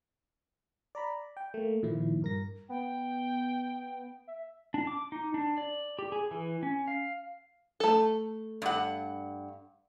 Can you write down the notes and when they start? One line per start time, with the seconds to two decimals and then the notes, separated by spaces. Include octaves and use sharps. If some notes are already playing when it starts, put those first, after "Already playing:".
0.95 D5 A#5 B5
1.37 G5
1.54 A3 A#3
1.83 A#2 D#3 F3 E4
2.22 G2 A#4 A#6
2.69 B3 G5
4.27 E5
4.74 D4
4.87 D6
5.12 D#4
5.34 D4
5.58 D5
5.99 G4
6.12 G#4
6.31 E3
6.63 C#4
6.88 F5
7.80 A3 A4
8.62 G2 F#5